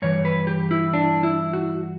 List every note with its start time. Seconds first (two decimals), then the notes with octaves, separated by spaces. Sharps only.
0.02 G2 E3 C#5
0.25 B4
0.47 G4
0.71 E4
0.94 D4
1.23 E4
1.53 F#4